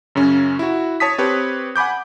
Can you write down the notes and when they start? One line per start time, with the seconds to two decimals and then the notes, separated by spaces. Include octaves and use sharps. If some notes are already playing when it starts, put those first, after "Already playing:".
0.15 F#2 C#3 C#4
0.59 E4 F#4
1.00 C#5 A5 D#6 B6
1.18 C4 G4 B4 C#5
1.76 F#5 G#5 B5 D6 G6